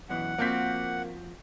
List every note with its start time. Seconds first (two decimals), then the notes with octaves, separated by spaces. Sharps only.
0.09 F#2 B2 E3 F#5
0.38 F3 A#3 C4 F#4 G6 B6